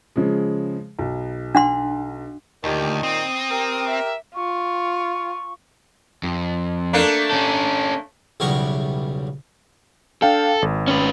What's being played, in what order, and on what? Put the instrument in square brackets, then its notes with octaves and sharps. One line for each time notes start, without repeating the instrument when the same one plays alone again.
[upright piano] C#3 F3 G#3
B1
[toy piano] D4 F#5 C6
[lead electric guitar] D2 [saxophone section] A#2 D#3 [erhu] G4
[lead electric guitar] C4 [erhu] D#6
[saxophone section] G4 A#4
[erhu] E5
[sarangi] F4 [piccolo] C#6
[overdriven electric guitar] F2
[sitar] A3 A#3 D4
[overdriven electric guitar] C#4 A4
[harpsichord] B1 E2 C#3 G3 A#4 C#6
[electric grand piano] D4 F5 G5 [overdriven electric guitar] A4
[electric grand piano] G#1
[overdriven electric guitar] C#4 B4